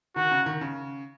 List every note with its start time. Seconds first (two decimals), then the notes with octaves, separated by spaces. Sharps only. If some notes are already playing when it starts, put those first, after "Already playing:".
0.16 D#3 F#4
0.31 C#3
0.46 D#3
0.61 C#3